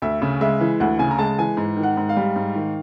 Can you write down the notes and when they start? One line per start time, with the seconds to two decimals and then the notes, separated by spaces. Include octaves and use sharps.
0.02 D2 E5
0.22 C#3
0.41 G#3 E5
0.61 E3
0.80 D2 F#5
0.99 C#3 G#5
1.11 A#5
1.19 G#3 A5
1.39 E3 G#5
1.57 G#2
1.77 D#3
1.83 F#5
1.97 G#2
2.09 F5
2.17 G3
2.36 G#2
2.55 D#3